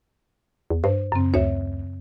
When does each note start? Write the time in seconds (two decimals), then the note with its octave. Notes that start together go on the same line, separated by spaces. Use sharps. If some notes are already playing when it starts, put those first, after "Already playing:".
0.70 E2
0.84 G2 C5
1.12 F#2 C#3 C4
1.34 D2 C#5 E5